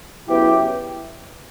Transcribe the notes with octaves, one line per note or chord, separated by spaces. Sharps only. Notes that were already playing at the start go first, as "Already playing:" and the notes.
C#3 F#3 B3 E4 G4